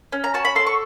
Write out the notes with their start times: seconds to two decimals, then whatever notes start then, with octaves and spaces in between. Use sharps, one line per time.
0.12 C#4
0.24 A#5
0.34 F#4 A5
0.45 B5
0.55 A4 C6
0.67 C#6